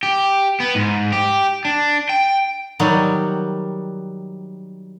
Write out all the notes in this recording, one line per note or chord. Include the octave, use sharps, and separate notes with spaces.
G4
B3
G#2
G4
D4
G5
D#3 F#3 G3